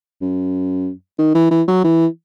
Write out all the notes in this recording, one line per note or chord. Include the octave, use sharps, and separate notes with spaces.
F#2
D#3
E3
E3
F#3
E3